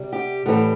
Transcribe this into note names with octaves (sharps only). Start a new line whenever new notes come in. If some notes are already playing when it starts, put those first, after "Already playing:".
Already playing: C3 G3
G4
A2 E3 G3